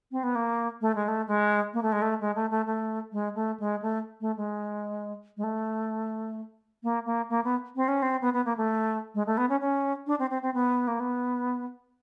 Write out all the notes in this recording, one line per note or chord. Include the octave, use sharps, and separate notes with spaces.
C4
B3
A#3
A3
G#3
A3
G#3
A#3
A3
G#3
A3
G#3
A3
A3
A3
G#3
A3
G#3
A3
A3
G#3
G#3
A3
A#3
A#3
A#3
B3
C4
C#4
C4
B3
B3
A#3
A3
G#3
A3
B3
C#4
C#4
D4
C4
C4
C4
B3
A#3
B3